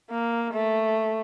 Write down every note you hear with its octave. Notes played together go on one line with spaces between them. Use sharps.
A#3
A3